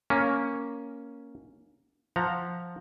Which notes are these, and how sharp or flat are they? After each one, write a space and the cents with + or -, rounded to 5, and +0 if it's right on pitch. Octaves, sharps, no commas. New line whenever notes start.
A#3 +0 C#4 +5
F3 +5 F#5 +0 A#5 +0